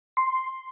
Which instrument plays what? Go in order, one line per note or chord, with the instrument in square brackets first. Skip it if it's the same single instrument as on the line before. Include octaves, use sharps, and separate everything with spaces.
[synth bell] C6